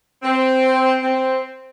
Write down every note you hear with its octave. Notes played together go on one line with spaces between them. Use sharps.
C4
C4